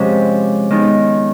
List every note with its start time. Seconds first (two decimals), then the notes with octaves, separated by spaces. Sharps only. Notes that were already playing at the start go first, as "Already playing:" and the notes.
Already playing: C3 F3 G#3 C#4
0.70 D#3 G#3 B3 D#4